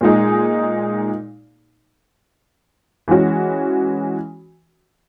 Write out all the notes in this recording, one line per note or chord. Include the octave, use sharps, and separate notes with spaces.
A#2 G#3 D#4 G#4
E3 G#3 C#4 F#4